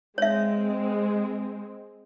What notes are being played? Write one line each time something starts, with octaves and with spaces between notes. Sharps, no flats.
G#3 C4 C#5 E5